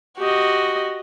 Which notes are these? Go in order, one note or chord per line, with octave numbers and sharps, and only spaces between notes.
F#4 G4 D#5